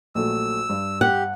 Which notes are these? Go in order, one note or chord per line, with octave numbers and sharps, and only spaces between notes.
A#1 F#3 A3 E6
G2
G4 F#5